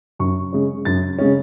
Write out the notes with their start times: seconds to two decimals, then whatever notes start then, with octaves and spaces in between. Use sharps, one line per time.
0.19 F#2 C#6
0.53 C#3 G#3 C#4
0.85 F#2 A6
1.19 C#3 G#3 C#4